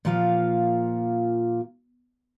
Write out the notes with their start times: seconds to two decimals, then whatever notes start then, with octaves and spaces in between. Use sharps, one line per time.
0.05 A#2 F3 A#3 F4 F5